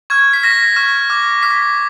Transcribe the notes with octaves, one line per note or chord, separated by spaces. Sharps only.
C#6 F6 G#6
B6
C#6 F6 A#6
A#6
C#6 F6
D6 F6
D6 F6 B6